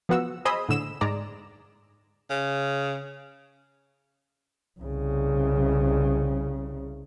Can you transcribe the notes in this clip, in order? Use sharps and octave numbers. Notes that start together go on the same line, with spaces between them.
F3 B3 F#4 E6
G#4 C5 D#5 B5 D#6 E6
A2 D3 E6 E7
G#2 G#3 D5 A#5
C#3
C2 C#3